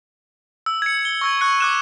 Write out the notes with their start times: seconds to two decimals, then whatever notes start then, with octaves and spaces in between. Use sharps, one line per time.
0.66 E6
0.82 G#6 C#7
1.05 G7
1.21 C#6 E6 G#6
1.41 C#6 F#6 C#7
1.60 D6 F#6 E7